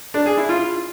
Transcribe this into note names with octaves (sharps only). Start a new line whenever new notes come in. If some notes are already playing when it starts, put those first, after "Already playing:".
D4
G#4
E4
F4